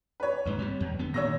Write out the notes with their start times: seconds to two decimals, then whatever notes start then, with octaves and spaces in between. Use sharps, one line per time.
0.20 B4 C#5
0.45 D2 G#2 C#3
0.58 C3 F3 G3
0.80 E2
0.99 D3 B3
1.14 A#2 D#3 C#5 E6 A#6